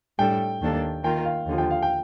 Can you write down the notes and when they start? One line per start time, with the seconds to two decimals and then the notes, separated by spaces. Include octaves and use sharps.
0.19 A2 G3 D4 A4 G5
0.61 D#2 D#3 A#3 D4 A4
1.04 D#3 A#3 F4 G5
1.25 F5
1.46 D#2 D3 F3
1.58 G5
1.71 F5
1.82 G5